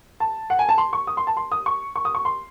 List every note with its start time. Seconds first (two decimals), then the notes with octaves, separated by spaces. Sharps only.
0.20 A5
0.50 F#5
0.59 G#5
0.69 A5
0.78 C6
0.93 C#6
1.07 D#6
1.17 C6
1.27 A5
1.37 C6
1.52 D#6
1.66 C#6
1.96 C#6
2.05 D#6
2.15 C#6
2.25 C6